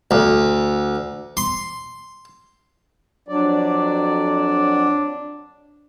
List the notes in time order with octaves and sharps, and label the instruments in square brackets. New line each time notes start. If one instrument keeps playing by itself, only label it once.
[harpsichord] D2
C6
[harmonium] F2 F#3 D5 [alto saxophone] D4